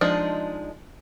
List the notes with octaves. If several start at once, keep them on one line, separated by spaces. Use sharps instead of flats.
F3 G#3 D4 D#4